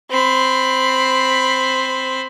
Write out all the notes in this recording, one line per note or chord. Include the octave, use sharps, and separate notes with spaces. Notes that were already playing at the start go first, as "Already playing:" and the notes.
C4 B5